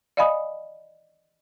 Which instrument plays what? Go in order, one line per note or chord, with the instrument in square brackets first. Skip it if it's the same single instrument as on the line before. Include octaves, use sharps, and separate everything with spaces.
[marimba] D5 D#5 F5 G#5 B5 D#6